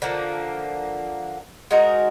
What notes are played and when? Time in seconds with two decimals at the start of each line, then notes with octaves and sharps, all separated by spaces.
0.02 D3 F3 A#3
1.71 G#3 D#4 F#4 A#4